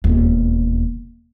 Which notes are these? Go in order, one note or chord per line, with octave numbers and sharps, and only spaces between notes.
E1 D#2